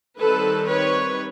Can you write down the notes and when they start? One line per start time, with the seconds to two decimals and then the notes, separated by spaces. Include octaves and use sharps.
0.19 D#3 G3 C4 A4 B4
0.69 B4 C#5